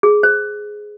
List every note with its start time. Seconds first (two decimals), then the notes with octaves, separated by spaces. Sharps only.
0.03 G#4
0.23 C5